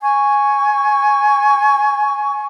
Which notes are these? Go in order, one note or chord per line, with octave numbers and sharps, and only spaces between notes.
G#5 C#6